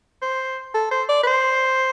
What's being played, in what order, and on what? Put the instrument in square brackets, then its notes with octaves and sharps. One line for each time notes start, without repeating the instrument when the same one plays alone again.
[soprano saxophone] C5
A4
C5
D5
B4
C5